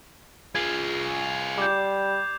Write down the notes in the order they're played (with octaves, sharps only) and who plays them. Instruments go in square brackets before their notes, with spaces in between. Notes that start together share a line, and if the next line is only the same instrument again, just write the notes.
[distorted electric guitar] F4 G#4 [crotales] G#6 C7
[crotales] F7
[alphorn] G3 [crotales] D6 G6